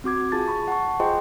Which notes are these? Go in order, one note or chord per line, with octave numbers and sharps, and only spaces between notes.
C4 F#4 D6 G#6
F4 G#4 A5 A6
B5 C#6
F#5 A5 C#6
F4 G#4 C5 D#5 G5 C6